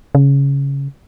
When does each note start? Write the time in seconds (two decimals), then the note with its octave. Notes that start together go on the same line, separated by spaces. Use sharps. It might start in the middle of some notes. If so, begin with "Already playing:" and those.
0.15 C#3